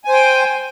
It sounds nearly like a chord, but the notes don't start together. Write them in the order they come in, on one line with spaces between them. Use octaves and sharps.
G#5 C5 G5